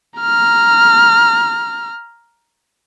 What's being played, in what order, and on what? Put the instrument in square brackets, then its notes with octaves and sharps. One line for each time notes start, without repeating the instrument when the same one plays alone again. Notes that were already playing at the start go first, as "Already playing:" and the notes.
[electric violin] A#5 F6